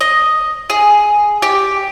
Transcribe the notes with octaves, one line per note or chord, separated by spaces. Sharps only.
D#5
G#4
G4